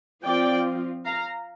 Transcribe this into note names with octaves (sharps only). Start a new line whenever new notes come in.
F3 C4 F4 D5 G5
F5 A#5